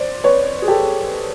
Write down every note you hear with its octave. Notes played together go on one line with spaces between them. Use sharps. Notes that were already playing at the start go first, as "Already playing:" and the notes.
Already playing: C5 D5
B4 C#5
G#4
G4 A4